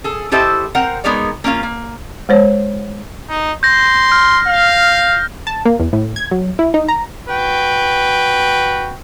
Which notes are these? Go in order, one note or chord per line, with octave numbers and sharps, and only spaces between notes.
G#4 A4
E4 G4 A4 C5 D#5 E5
C4 A#4 C5 F#5 A#5
G#3 B3 D#4 A#4 C#5 D5
A#3 C#4 F4 F5
A#3
G#3 C5 C#5
D#4
C6 G6 A#6
F6
F5
A5
A#3
E2
A2
G#6
F#3
E4
D#4
A#5
F#4 B4 G5